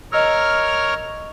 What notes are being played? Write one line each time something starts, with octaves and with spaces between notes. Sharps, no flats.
A#4 C#5 D#5 E6 F6